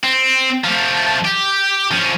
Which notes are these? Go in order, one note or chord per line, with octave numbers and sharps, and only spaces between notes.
C4
F3 A3
G4
F3 C#4